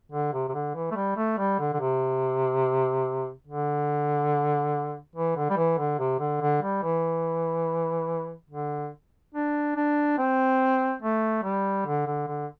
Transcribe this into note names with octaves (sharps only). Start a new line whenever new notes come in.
D3
C3
C3
D3
E3
A3
G3
A3
G3
D3
D3
C3
D3
E3
D3
G3
E3
D3
C3
D3
D3
G3
E3
D3
D4
D4
C4
A3
G3
D3
D3
D3